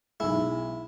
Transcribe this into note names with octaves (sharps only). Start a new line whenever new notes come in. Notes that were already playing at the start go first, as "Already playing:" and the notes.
B1 G#3 E4